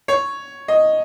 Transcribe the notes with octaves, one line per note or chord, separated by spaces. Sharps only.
C#5
D#5